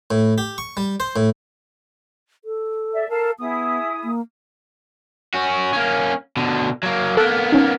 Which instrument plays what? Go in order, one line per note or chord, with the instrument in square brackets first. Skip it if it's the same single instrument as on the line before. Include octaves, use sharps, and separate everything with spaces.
[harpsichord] A2
G4
C#6
G3
C5
A2
[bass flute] A4
[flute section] D5 E5
[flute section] A4 F5 A5 [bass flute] A#4
[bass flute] B3 [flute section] E4 G#4 D#6
[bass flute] A#3
[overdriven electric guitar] C#4 F#4
A#3 C#4
B2 D3
F#3 A#3
[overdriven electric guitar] A#3 B3 [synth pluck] A4 F#6
[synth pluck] C#4 D#4